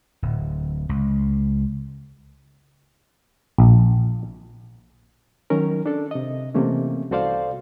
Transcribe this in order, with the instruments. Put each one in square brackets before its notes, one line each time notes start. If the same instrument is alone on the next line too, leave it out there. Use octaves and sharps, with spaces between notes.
[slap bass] D1
C#2
[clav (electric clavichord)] A#1
[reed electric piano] D#3 F#3 C#4 A#4
D4 A4
C3 D#5
C3 E3 A3 A#3 C#4
C2 F#4 A4 C5 D5 F5